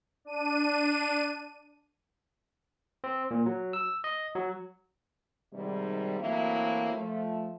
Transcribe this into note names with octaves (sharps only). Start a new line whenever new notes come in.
D4 D#7
C4
A#2
F#3
E6
D#5
F#3
G#2 C3 D#3 G3
E3 F#3 A3 A#3 C4 E4
F3 A3